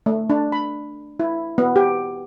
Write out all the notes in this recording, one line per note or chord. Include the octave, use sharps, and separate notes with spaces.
A3
D4
B5
E4
B3
G4